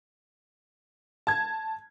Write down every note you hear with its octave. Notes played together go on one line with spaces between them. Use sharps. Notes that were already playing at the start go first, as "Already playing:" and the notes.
A5 G#6